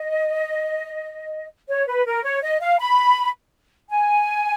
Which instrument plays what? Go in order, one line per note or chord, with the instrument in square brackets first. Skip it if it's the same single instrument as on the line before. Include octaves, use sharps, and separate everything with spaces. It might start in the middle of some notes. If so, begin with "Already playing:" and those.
Already playing: [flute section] D#5
C#5
B4
A#4
C#5
D#5
F5
B5
G#5